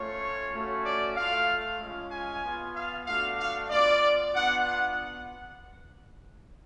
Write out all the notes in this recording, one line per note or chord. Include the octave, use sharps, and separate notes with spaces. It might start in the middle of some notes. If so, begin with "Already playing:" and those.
Already playing: A3 C#4 F4 C#5
A3 C#4 F#4
D5
A3 F4 F5
G#3 C#4 F4
G#5
B3 F4
F5
A3 D4 F#4 F5
F5
B3 F4 D5
B3 D4 F4 F#5
F#5